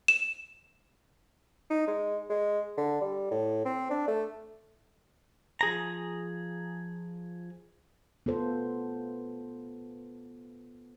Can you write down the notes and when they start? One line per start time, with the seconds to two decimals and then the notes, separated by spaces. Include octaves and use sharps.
0.08 E7
1.71 D#4
1.88 G#3
2.30 G#3
2.78 D3
3.02 G3
3.31 A2
3.66 C4
3.91 D4
4.08 A3
5.61 F3 G#4 A#5
8.26 B3 F4 A4 C5